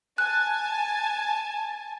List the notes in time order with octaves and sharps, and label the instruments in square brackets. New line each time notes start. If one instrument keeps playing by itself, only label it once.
[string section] G#5 A5 [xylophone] F#6